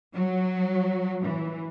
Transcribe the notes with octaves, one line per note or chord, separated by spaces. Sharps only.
F#3
E3